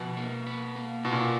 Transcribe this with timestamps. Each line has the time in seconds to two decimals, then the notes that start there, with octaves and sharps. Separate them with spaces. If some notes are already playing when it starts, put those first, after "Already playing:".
Already playing: B2 F3 B4
0.17 A#3
0.47 B4
0.76 A#3
1.05 B2 F4
1.13 A#2